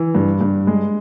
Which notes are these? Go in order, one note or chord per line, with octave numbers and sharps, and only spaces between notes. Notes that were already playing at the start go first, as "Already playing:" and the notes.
Already playing: E3
G2
G2
G#3